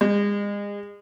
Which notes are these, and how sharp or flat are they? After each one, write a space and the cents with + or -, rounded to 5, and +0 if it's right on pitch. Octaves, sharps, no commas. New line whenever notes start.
G#3 -35